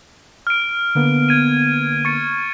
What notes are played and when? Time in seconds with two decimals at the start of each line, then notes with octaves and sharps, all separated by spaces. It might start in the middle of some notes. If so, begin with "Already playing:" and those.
0.47 F6 D7
0.95 D3 A#3 B3
1.29 G#6 D#7
2.05 C#6 A6 C#7